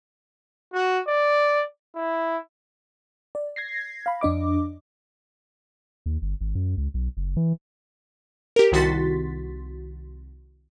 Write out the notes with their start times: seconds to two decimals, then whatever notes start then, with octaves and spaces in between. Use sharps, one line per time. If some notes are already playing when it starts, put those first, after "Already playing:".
0.74 F#4
1.08 D5
1.96 E4
3.35 D5
3.56 G#6 A#6 C7
4.06 F5 B5
4.21 F2 D4 D#5 D6
6.06 D#2
6.22 G1
6.41 G#1
6.55 F#2
6.77 C#2
6.94 B1
7.17 F#1
7.37 E3
8.56 G4 A#4
8.72 C2 D#3 F#4 C6 A6 B6